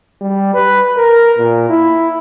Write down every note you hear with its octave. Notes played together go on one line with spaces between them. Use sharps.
G3
B4
A#4
A#2
E4